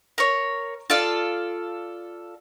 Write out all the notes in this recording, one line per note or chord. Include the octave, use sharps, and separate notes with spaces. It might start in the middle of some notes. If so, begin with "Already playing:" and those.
A#4 C#5
F4 A4 D5 F5